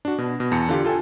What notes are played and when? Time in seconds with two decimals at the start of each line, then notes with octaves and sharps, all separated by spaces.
0.05 D4 F#4
0.18 B2
0.40 B2
0.52 E2 A5 C#7
0.69 D3 F4 G4
0.85 F4 A4 G5 G#5